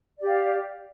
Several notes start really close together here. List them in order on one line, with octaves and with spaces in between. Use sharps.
D5 G4 F5